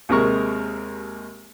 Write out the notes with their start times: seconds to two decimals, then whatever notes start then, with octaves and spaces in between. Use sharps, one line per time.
0.09 D#2 C3 G#3 A#4 C#6